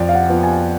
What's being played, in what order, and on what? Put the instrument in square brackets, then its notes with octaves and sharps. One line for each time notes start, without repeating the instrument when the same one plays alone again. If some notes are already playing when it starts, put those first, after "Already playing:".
Already playing: [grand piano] F2 [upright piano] D5
[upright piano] F5
F#5
[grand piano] F3 B3
[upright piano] G#5